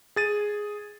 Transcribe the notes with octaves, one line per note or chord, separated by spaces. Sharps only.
G#4 A6 D#7